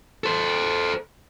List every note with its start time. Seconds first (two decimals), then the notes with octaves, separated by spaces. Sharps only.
0.24 A4 C5